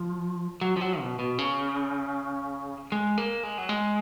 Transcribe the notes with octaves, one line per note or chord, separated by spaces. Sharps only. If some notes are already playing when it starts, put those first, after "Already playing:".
Already playing: F3
F#3
F3
F#3
B2
B2
C#3
G#3
A#3
G#3
F#3
G#3